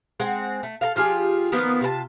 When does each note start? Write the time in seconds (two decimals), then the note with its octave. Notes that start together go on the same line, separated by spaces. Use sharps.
0.20 G#3 C4 F#5
0.63 A3
0.81 A4 A#4 F5
0.96 F3 F4 G4 G#4
1.52 D#3 F3 A#3 B3
1.81 C3 F4 A#4 A5